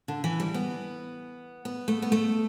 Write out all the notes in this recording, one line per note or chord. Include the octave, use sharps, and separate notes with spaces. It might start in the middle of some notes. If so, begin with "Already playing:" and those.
D3
E3
G3
B3
B3
A3
B3
A3